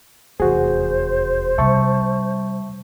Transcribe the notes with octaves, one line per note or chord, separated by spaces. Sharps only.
F1 E2 F#4 G#4 C5
C3 G3 E5 A5 C#6